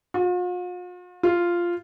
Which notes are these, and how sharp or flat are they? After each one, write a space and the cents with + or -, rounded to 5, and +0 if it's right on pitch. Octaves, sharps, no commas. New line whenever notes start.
F4 +45
F4 -5